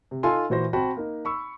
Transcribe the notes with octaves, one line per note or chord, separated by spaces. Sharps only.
C3
D#4 F4 A4 G#5 C6
A#2 E3 F#4 C5 A#6
C4 F#4 G5 A5 B5
A#3 D#4
B5 C#6 E6